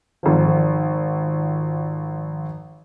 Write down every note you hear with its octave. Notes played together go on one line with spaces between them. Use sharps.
G#1 F3